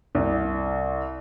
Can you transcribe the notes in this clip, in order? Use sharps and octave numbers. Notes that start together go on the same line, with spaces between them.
C2